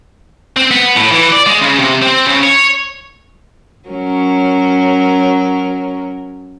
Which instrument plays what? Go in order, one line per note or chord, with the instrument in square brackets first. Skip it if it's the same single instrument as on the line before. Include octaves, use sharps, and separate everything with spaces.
[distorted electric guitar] C4
B3
A2
E3
D5
G#3
C#3
C3
C4
C#3
C#5
[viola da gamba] F#3 C#4 A#4